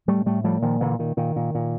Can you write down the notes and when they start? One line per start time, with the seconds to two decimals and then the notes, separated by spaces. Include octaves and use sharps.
0.08 A2 G3 A3
0.26 A2 G3 A3
0.44 A2 F3 G3
0.62 A#2 D#3 F3
0.81 A#2 D3 E3
0.99 A#2 D#3
1.17 A#2 D#3
1.36 A#2
1.55 A#2